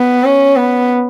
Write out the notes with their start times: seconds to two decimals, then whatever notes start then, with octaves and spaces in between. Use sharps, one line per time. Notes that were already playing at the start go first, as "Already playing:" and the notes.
Already playing: B3
0.24 C#4
0.56 B3